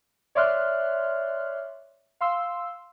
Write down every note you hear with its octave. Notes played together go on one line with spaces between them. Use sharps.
C#5 D5 E5 C6 F6 F#6
F5 C6 E6